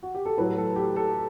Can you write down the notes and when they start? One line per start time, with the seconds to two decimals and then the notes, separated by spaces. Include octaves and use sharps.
0.03 F#4
0.15 G4
0.25 A4
0.37 A2 F#3 B4
0.57 A4
0.76 G4
0.96 A4